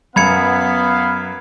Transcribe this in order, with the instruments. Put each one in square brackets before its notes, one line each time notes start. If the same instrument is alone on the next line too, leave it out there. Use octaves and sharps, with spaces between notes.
[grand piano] F#2 [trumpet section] B3 F5 [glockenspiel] B5 G#6 C#7